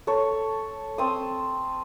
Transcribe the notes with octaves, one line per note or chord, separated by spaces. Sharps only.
A4 C#5
C4 A5 D#6